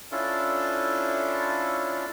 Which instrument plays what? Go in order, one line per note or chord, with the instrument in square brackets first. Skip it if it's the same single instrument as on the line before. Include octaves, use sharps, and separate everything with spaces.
[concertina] C#4 D4 E4 F4 A4